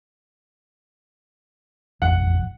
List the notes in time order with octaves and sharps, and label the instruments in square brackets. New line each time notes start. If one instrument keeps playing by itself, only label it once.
[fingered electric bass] E1 A1 F2 [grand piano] F#5